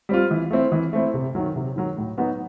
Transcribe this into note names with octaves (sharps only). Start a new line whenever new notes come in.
G3 C4 F4
E3
A3 C4 E4
E3
A3 C4 E4
C3
D#3 F#3
C3
D#3 F#3
A2
F#3 B3 D#4 F#4